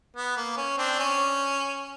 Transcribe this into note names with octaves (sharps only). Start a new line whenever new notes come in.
B3
A#3
C#4
C4 D4
C#4